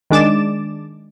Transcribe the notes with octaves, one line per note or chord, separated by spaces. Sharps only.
D#3 G#3 D4 D6 A6 E7